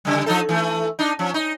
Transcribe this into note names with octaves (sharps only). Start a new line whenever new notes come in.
C#3 G3
F3 D#4 A4
E3 A3
D4 D#4
F3 C#4
D#4